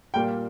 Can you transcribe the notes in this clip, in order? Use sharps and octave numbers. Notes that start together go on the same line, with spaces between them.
A#2 G3 A#3 G5